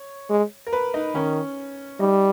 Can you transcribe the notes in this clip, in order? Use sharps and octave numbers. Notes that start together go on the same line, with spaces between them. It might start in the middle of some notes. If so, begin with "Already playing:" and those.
Already playing: C#5
G#3
A#4
B4
D#4
D#3 C#4
G3 D#4